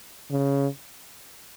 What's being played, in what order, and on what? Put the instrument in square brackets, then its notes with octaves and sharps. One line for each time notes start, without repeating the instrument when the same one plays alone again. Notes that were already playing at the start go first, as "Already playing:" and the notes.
[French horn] C#3